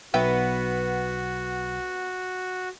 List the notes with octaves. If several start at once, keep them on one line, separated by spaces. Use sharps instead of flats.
B1 F#3 B3 F#4 E5 G5